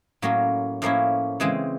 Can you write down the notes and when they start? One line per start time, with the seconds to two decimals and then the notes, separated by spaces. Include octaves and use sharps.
0.22 A2 F#3 A#3 C#4
0.82 A2 F3 A#3 C#4 E4
1.40 C#3 E3 G#3 C4